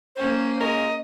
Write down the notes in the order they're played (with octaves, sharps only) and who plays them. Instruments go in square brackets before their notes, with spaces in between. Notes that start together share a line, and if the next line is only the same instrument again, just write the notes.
[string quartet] A#3 C#4 [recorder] C5
[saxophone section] G#3 F4 A#4 [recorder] D#5